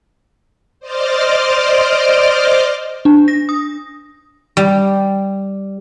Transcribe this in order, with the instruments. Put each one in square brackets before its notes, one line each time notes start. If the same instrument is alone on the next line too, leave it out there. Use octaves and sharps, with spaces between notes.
[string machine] C5 D5 D#5 C6 D6 F6
[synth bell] D4
A#6
D#6
[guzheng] G3